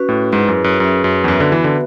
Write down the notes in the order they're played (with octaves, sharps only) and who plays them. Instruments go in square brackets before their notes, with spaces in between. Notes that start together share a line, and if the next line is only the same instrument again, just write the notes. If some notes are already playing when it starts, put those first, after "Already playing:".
Already playing: [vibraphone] C#4 F#4 B4
[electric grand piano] A2
[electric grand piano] G#2 [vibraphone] E4 G#4 B4
[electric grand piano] F#2
F#2
[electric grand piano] F#2 [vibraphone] C#4 G#4 B4 E5
[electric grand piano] F#2
E2
[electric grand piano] F#2 [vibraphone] B3 F#4 B4 E5
[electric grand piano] D3
E3
D3